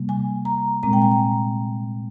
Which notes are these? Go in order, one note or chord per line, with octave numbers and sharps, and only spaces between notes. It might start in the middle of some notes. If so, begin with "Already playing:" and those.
Already playing: C3 G3 A#3
G#5
A#5
A#2 G#3 C4 A#5
G5
G#5
A#5